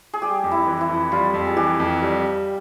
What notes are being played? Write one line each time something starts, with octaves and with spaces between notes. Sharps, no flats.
G#4
G3 G4
F2
E4
E3
E4
F2
G3 F4
F2
G#4
E3 G4
F2
G3